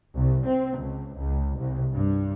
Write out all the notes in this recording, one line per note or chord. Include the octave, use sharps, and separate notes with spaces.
C2
C4
C#2
C#2
C2
G2